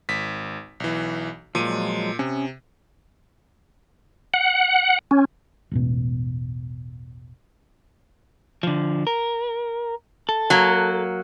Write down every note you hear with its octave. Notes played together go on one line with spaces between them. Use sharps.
G#1 B6
B1 E3
A#2 F3 F#3 G#3 D#7
C3 C#4 D#6
F#5
C#4
E1 A1 B2
D3 F3
A#4
A4
F#3 A#3